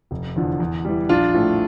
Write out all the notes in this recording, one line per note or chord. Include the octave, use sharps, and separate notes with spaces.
F1
E2 D3 F3
E2
E3 G3
A#1 D4 F4
A2 F3 A3